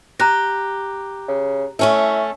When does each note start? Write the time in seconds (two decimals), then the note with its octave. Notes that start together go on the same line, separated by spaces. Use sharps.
0.19 G4 A#5 F#6 A#6
1.28 C#3
1.79 A3 C#4 E4 A4